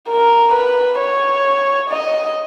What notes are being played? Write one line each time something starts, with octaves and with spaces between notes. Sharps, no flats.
A#4
B4
C#5
D#5